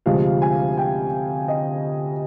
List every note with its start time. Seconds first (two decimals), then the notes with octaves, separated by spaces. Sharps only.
0.06 D2 C3 F3 G#3 F5
0.42 G#5
0.77 G5
1.48 D#5